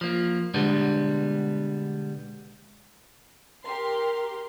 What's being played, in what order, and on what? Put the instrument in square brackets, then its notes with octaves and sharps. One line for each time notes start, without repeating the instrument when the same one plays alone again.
[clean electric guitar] F3 A#3
B2 D3 G3 G#3 B3
[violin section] G4 A#4 C6